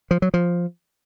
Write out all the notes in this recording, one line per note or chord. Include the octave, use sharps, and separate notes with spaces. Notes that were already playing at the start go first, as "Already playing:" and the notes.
F3
F#3
F3